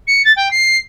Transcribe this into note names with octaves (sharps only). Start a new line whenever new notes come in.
C#7
A6
G5
C7